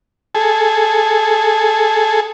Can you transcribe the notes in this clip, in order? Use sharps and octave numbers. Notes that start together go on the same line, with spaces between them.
G#4 A4